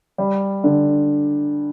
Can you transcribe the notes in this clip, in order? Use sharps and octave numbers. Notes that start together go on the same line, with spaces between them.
G3
D3